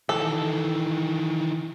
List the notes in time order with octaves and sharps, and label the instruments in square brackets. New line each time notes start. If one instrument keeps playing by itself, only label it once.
[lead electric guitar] D#3 E3 [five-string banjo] A4